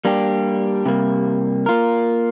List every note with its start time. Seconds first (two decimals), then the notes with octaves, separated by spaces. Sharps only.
0.05 G3 A#3 D4 G4
0.86 C3 G3 A#3
1.66 A#3 F4 A#4